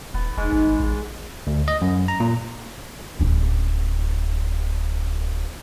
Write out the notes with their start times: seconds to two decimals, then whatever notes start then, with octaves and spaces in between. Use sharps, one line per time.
0.14 D#1 B3
0.38 E1 G#2 G#3
0.52 G#1
0.80 A1
1.47 D2
1.68 D#5
1.81 F#2
2.08 A#5
2.20 A#2
3.19 D1 C#4